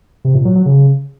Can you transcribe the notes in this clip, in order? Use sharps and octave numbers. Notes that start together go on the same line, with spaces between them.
C3
A#2
F#3
F#3
C#3